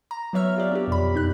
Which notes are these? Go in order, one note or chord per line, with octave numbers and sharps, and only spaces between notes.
A#5
F#3 B3 E4 C#5 E5 F6
F4 G4 D5
B3 D4 G4
F2 B2 B5
F#2 B3 D#4 F#6